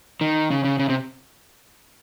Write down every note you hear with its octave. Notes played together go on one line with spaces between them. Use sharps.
D#3
C#3
C#3
C#3
C3